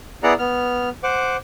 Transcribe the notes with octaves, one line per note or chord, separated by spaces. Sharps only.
B3 E4 G#4 D5 F#5 A#5
B3 F6
C5 F#5 D6